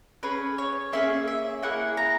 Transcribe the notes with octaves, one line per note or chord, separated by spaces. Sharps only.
C#4 G#4 B4
C#5
A#3 C#4 G#4 E5
E5
A#3 E4 G#4 F#5
A#5